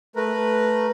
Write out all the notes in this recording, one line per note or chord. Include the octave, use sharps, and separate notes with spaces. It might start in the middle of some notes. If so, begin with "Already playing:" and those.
A3 A#4 B4